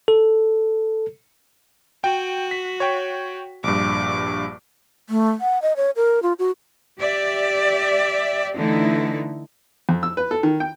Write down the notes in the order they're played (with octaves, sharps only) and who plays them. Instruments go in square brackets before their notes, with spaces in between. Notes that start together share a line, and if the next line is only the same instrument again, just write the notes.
[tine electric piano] A4
[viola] F#4 [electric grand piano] G5
[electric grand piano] B6
C#5 G5
[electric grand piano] A#1 G2 [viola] D6
[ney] A3
F#5
D#5
C#5
A#4
F4
F#4
[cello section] G4 D5 E5
D3 E3 A3 D#4 E4
[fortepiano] F2
E6
B4
A4
D#3
G5